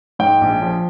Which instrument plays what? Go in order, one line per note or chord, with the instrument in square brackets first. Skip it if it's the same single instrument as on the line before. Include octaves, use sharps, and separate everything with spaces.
[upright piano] G#2 G5
A#1
F3